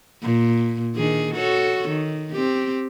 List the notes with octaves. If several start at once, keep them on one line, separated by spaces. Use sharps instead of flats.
A#2
D#3 D4 G#4
F#4 A4 C#5
D#3
C4 G4